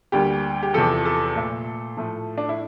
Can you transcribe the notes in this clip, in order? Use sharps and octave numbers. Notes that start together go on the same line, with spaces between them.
D2 D3 G3 A#3 G4
G4
E2 C3 F3 A4
A4
A#2 A3
A2 F3 A3
D4
E4